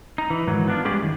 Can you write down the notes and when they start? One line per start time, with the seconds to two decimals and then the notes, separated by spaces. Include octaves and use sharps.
0.18 D#4
0.30 E3
0.47 G#2 D#3 E3 F#3
0.68 B3 D4 F4
0.85 G3 G#3 C#4 G4 G#4 D5
1.01 F#2 D#3